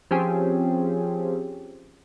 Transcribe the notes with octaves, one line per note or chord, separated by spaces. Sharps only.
F3 C4 C#4 G4 G#4